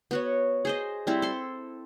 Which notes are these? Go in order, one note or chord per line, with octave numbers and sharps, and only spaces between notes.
B3 F#4 C#5
G#4 C5 D#5
G3 C4 E4
A4 C6